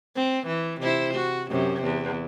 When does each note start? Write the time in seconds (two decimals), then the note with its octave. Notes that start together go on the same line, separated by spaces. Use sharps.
0.15 C4
0.47 E3
0.81 C3 E4 C5
1.14 F#4
1.50 F#2 C3
1.83 E2